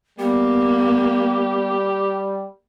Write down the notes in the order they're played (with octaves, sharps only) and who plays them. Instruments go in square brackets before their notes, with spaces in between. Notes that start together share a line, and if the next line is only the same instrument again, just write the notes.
[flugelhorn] G3 [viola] A#3 [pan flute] B3 [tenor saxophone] G4